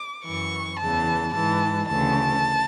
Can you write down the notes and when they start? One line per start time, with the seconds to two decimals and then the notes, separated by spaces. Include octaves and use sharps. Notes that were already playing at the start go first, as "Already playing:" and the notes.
Already playing: D6
0.25 F#2 E3 C#6
0.79 E2 C#3 E3 A5
1.34 G#2 E3 A5
1.89 D2 C#3 E3 A5